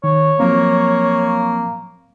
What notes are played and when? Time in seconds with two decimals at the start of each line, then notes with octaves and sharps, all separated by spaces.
0.04 D#3 C#5
0.40 F3 F#3 A#3 C4